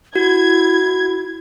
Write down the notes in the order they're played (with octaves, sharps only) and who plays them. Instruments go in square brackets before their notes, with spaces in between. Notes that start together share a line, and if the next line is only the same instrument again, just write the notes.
[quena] E4 [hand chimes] F#4 [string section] G#6